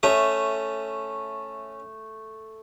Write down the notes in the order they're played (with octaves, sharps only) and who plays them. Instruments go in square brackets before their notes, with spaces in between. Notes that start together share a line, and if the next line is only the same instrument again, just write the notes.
[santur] A3 [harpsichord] C#4 E5 D#6